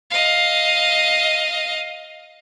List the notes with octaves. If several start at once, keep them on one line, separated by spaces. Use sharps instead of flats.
D#5 F5